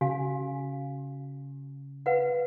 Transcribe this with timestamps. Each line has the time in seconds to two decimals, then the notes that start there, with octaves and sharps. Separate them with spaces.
0.01 C#3 F#4 F5 G#5
2.06 B4 F5 F#5